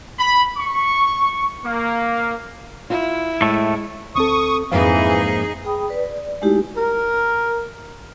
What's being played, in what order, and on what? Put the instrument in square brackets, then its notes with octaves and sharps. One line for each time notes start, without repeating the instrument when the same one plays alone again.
[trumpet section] B5
C#6
A#3
[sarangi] E4 [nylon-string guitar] F4
[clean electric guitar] A2 A3 [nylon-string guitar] G#3
[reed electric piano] D2 C4 A4 [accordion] C#6 D#6
[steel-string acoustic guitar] F2 G#2 A#3 [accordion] E3 [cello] D#4 G#4 [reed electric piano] F5
[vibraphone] G#4 G5 B5 D#6
B4 D5
D5
G#3 A3 D#4 E4 F#4 G4
[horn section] A#4